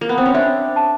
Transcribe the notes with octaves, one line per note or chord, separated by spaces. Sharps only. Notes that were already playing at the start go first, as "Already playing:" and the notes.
A#3
B3
C4
C#4
C4 D4 E5
A5